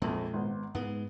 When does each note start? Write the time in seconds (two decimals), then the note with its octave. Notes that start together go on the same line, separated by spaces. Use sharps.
0.02 A#1 F2 A#2 G#3
0.33 G#1 B3
0.75 G#2 G#3 B3